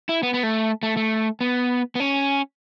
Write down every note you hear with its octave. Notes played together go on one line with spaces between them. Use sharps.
E4
B3
B3
A3
A3
A3
B3
B3
C#4